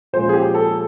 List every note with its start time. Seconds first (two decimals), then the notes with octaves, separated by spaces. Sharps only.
0.13 A#2 F3 G#3 C#4 C5
0.29 G#4
0.34 G4
0.55 A4